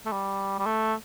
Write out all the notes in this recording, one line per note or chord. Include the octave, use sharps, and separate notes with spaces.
A3
G3
G3
A3